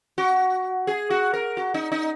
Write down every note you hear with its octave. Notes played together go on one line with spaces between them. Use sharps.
F#4
G#4
F#4
A#4
F#4
D#4
D#4